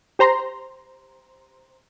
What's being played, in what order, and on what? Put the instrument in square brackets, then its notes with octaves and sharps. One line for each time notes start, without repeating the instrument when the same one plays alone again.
[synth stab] G4 C5 A#5 C6